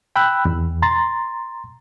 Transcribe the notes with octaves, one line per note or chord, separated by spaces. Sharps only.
G5 B5 E6 F#6
E2
A#5 C6 A6